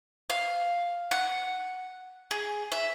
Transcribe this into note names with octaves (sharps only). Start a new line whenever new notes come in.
F5
F#5
G#4
E5